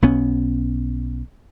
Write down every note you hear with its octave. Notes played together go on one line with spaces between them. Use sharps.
B1 B3 C#4